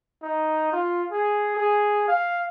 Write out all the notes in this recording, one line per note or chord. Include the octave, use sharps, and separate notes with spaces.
D#4
F4
G#4
G#4
F5